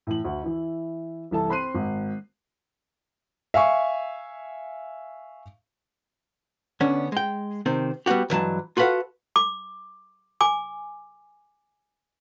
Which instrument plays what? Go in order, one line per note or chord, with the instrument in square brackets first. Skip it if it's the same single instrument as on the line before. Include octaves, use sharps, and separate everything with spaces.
[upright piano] A2 E3 F#7
D2
E3 E4
C2 E3 A4 A5
C4 B5 C6 F#6 C7 D#7
G#1
[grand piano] E5 F5 G#5 C#6
[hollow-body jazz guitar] D3 B3 C#4 D4
G#3 G5
C3 D#3 C4
G3 B3 D#4 F#4 G4
B1 G2 E3 F#3 G#3 A5
F4 F#4 A4 B4 F5 F#5
[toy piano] D6
G#5 D6